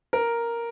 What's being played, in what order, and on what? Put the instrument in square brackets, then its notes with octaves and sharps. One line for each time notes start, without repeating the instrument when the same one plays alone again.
[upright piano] A#4